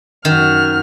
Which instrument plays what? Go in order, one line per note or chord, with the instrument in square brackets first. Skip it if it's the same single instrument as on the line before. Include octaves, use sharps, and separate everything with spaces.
[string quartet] F#2 F#4 F6 [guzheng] D#3